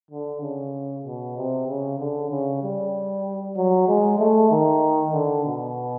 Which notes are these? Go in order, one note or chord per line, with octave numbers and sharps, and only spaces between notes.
D3
C#3
B2
C3
C#3
D3
C#3
G3
F#3
G#3
A3
D#3
D3
B2